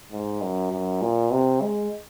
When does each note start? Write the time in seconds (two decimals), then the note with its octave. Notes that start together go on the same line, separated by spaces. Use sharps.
0.12 G#2
0.42 F#2
0.72 F#2
1.02 A#2
1.32 C3
1.62 G#3